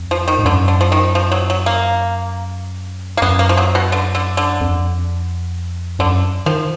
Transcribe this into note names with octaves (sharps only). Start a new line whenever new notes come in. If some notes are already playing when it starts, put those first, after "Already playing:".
Already playing: F2
F3
D#3
G#2
F#2 D3
D3
F3
D#3
F3
F#3
F#3
A#3
A#3
F#2 B3
A#3
F3
F#3
B2
D3
D3
D3
F2
F#2 D3
D#3 F3